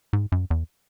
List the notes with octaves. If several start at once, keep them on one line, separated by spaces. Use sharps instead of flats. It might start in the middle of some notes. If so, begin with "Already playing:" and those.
G#2
F#2
E2